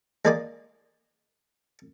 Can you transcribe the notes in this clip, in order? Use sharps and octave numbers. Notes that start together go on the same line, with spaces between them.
G#3 A#3 D5 D#5 G#5 D6